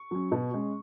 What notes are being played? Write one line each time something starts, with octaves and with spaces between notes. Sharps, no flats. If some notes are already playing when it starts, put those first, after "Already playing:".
Already playing: C#6
F#3 C#4
B2
G#3 C#4